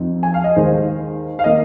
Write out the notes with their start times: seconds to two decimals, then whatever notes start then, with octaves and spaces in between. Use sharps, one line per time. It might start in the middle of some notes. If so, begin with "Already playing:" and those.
Already playing: F2 F3 C4 D#4
0.23 G#5
0.34 F5
0.44 D#5
0.56 D#2 D#3 G#3 C5
1.39 F5
1.44 D#3 A#3 D#5